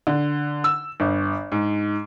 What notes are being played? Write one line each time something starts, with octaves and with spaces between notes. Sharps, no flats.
D3
E6
G1
G#2